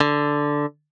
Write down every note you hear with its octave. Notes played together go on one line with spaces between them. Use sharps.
D3